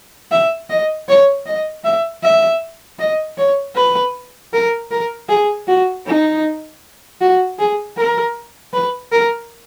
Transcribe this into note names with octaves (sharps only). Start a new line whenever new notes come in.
E5
D#5
C#5
D#5
E5
E5
D#5
C#5
B4
A#4
A#4
G#4
F#4
D#4
F#4
G#4
A#4
B4
A#4